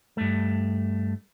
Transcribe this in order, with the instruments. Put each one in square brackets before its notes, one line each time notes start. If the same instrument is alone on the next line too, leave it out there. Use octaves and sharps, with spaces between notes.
[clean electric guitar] G2 A3